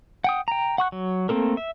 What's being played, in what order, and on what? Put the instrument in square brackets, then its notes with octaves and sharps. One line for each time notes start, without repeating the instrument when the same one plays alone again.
[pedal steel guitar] F#5 G5 D#6
G5 A#5
F#5 C#6 F#6
F#3
A3 A#3 C4 A4 A#4
E5